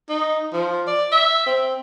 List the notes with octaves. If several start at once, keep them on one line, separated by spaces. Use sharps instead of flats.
D#4
F3
D5
E5
C4